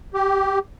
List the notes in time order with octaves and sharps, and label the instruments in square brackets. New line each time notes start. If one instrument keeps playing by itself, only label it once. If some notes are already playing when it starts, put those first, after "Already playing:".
[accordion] G4